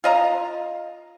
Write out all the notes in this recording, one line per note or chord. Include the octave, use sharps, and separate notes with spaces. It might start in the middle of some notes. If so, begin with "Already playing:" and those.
F4 D#5 A#5